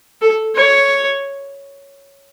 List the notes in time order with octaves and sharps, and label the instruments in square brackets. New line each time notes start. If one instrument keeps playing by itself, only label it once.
[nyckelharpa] A4
C#5